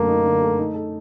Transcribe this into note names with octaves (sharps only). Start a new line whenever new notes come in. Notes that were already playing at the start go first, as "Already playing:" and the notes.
Already playing: F#2 D3 A3 A#3
D#4
D3
A3
D#4
A4